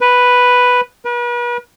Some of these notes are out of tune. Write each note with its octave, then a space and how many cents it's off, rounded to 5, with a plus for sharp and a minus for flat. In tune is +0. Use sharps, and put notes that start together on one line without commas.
B4 +0
B4 -40